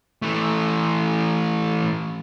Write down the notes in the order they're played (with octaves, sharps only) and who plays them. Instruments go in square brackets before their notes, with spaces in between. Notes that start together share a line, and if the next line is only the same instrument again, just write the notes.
[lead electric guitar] E3 A3